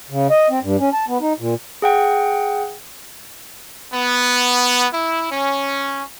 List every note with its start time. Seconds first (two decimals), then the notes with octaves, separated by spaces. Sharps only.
0.10 C#3
0.30 D#5
0.50 C4
0.63 G2
0.79 C#4
0.93 A5
1.08 B3
1.21 D#4
1.39 A#2
1.82 G#4 F#5 G5
3.94 B3
4.93 E4
5.30 C#4